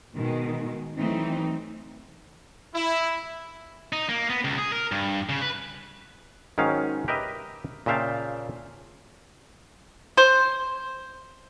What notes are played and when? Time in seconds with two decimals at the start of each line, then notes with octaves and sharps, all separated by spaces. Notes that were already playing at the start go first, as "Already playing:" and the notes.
0.15 B2 D#3 G#3
0.98 E3 F#3 A3 C4 D#4
2.75 E4
3.93 D#4
4.09 A#3
4.30 B3
4.45 C#2
4.58 G#4
4.72 A#4
4.92 G2
5.29 C#3
5.42 B4
6.58 G#2 D#3 F#3 C#4 F5
7.08 G4 A#4 B4 D#5 E5
7.86 A#2 C#3 E5 F5 G5 A5
10.17 C5